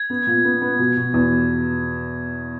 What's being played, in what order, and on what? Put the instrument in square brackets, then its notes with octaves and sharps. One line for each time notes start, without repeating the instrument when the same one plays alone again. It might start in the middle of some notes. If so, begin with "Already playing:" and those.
Already playing: [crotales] G#6
[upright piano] B3
A#2
B3
B3
B2
B2
E2